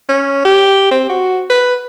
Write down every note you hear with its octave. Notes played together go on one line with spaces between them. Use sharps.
C#4
G4
C4
F#4
B4